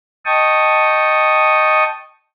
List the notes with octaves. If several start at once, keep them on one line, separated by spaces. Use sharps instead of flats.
D#5 G5 A5 C#6 D#6